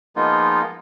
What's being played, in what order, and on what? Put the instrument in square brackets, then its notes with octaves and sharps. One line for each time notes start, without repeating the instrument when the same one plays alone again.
[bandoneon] F3 G#3 A#3 B3 D#4 F4